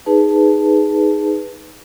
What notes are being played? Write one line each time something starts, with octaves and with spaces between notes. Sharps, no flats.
D#4 G#4 B4 A5